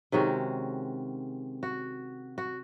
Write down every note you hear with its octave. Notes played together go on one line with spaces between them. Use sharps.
C3 D#3 G#3 C#4 F#4
F#4
F#4